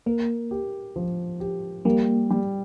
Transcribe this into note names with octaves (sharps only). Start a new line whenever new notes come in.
A#3 A#4
G4
F3
G4
G3 A#3
G3